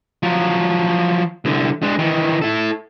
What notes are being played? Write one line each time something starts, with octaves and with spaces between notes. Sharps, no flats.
F3 F#3
C2 D3
G#3 D4
D#3 E3
E4 A4